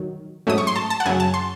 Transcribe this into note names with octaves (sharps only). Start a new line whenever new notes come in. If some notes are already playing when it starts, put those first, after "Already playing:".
Already playing: D#3 F#3
G#2 F#3 A3 C#4 D#6
C#6
C6
A5
A5
F#5
F#2 C#3 F#3 G#5
A5
C6